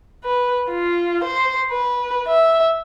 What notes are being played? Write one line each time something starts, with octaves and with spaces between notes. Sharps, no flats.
B4
F4
C5
B4
E5